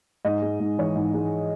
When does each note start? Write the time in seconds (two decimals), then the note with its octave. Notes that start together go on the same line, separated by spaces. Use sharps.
0.25 G#2 D#5
0.42 G#3
0.60 G#2
0.78 E3 C#5
0.96 G#2
1.14 G#3